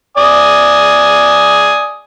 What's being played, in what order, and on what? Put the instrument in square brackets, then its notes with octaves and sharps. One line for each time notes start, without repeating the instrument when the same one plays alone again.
[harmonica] D5 G#5 D#6